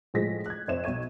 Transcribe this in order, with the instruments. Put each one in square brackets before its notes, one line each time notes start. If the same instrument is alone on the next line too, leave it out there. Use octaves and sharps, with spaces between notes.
[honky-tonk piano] A2 F3 G#3 A#6 B6
F#6 G#6
F2 C5 C#5 E5 E7
B1 C#6 G#6 D#7